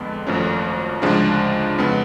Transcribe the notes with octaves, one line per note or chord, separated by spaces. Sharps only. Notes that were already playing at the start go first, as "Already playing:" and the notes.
Already playing: F2 D3 G#3 B3
G#1 F#2 F3 A3 C#4
D2 C#3 F3 G#3 D4
F2 C#3 G#3 B3